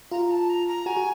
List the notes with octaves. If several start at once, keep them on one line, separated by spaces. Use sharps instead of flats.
F4 A#5
A5
A#5
A#5
F#4 G#5
F#4